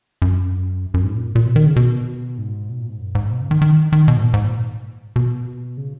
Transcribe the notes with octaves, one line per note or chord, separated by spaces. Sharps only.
F#2
F#2
G#2
A#2
A#2
B2
D#3
C#3
B2
G#2
B2
A#2
G#2
F#2
G#2
B2
C#3
D#3
D#3
D#3
B2
G#2
A#2
G#2
A#2
B2
C#3